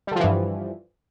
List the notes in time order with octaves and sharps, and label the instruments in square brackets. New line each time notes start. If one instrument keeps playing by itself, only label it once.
[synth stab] G3
D3
F3
E3
G2